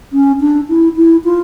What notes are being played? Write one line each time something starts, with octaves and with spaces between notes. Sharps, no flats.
C#4
D4
E4
E4
F4